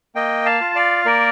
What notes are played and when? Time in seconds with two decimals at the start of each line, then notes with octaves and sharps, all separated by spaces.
0.15 A#3 D#5 G5
0.46 F5 A5
0.61 F4
0.75 D5 F5
1.06 A#3 A#4 D5